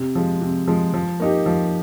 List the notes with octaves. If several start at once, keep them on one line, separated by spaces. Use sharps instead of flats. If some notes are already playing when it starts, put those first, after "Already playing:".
Already playing: C3
F3 G#3
C3
F3 G#3
F3
A#3 D#4 G4
F3